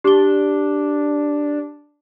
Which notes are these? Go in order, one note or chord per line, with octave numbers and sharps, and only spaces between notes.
D4 G4 G7